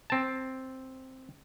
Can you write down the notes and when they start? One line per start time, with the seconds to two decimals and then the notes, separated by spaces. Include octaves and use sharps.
0.10 C4 A5